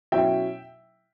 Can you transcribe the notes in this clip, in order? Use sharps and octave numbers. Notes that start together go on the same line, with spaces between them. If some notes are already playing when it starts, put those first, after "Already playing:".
B2 F#3 C#4 E4 E5 G5